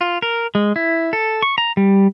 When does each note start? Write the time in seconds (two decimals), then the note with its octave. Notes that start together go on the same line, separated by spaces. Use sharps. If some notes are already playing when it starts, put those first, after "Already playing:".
0.01 F4
0.22 A#4
0.55 G#3
0.76 E4
1.13 A4
1.43 C#6
1.58 A#5
1.77 G3